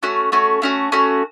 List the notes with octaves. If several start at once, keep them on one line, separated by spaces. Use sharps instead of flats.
A3 C#4 F#4
A3 C#4 F#4
A3 C#4 F#4
A3 C#4 F#4